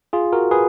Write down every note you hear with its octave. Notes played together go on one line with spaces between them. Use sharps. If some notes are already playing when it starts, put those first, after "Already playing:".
F4 G#4
F#4 A#4
G#4 B4